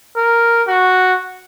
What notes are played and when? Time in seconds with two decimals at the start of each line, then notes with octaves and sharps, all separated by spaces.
0.16 A#4
0.67 F#4